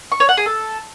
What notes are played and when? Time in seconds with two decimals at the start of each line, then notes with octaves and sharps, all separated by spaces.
0.12 C#6
0.20 C#5
0.29 F#5
0.37 G#4
0.46 A4